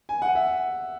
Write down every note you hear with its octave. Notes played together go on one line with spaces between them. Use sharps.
G#5
F#5
E5